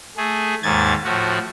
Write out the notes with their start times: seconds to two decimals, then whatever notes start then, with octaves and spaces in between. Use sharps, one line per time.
0.17 A3 G#4
0.63 D#2 G#2 G#6 A6
1.04 A2 F3 F#4